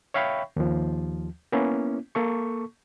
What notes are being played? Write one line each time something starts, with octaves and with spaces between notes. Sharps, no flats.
C#5 E5 F5 G5 B5 C#6
D#2 F3
A#3 B3 C#4 E4
A#3 A4 C#6